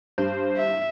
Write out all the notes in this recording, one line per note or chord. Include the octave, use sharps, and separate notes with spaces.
G2 C5
E5